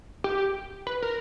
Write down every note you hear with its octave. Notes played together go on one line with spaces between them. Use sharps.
G4
B4
A#4